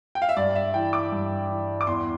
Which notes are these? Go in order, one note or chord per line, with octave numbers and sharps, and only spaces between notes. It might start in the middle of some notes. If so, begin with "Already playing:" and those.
G5
F5
E5
G2 D5
E5
E3 G5
D6
G2
E3
D6
E2 C6